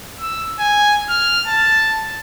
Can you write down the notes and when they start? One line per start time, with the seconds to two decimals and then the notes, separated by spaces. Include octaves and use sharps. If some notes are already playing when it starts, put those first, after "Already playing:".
0.21 E6
0.59 G#5
1.09 F6
1.47 A5